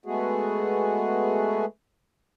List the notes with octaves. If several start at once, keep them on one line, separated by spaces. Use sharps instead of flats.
G#3 A3 B3 F#4 G#4